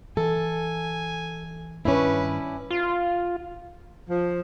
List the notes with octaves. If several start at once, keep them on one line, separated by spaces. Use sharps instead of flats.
E3 A4 G#5
G2 D#3 C#4 D4 E4 B4
F4
F3